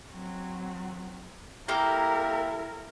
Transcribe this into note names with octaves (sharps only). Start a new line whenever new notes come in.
F#3 C4
A#3 E4 G4 A4 A#4